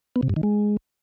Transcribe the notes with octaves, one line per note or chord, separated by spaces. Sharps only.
B3
C3
G2
D#3
G#3